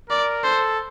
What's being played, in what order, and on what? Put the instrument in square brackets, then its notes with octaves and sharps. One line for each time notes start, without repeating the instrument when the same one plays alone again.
[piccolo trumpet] A#4 [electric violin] D5
[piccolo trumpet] A4 [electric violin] C5